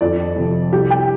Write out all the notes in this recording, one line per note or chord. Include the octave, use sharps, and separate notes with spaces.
F2 D5
C3 F3
C2 G4
G5